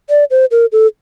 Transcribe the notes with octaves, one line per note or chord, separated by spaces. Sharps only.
D5
C5
A#4
A4